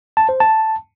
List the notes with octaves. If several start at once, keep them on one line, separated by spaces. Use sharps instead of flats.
A5
C5
A5